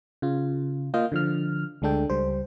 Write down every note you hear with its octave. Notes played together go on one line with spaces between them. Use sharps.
C#3 F4
A#3 F4 D#5 F5 G6
D3 F3 F6
D2 G#3 D4 A4 G5
C#2 G3 C5